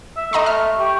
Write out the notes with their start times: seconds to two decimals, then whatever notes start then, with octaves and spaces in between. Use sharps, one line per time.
0.17 E5
0.33 A3 D#5 A#5 C6
0.46 E5 F6
0.79 G4 C#6